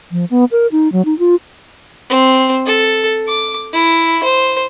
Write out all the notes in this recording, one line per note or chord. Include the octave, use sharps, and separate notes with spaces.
F3
B3
A#4
D#4
F#3
D#4
F4
C4
A4
D6
E4
C5